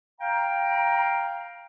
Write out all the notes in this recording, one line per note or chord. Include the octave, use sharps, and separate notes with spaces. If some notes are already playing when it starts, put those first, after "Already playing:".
F5 G5 A#5